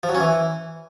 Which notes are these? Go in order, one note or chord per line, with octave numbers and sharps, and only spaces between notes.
F3
F#3
C#4
E3